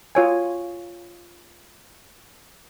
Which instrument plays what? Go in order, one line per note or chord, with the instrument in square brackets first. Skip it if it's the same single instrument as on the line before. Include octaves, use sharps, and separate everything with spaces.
[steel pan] F4 C#5 G#5